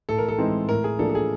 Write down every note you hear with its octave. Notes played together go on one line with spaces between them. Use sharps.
A2 A4
A#4
A4
E3 G#3 C4 D#4
A2 A#4
G#4
F3 A#3 D4 A4
A4
G#4